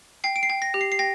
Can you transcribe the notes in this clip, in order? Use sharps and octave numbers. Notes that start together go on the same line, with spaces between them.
G5 C7
D7
C7
G5
A#6
G4
C7
C7
G5 A#6